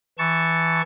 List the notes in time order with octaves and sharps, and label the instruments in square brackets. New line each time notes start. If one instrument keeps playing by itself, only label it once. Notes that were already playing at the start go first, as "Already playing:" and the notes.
[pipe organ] E3 A5 C#6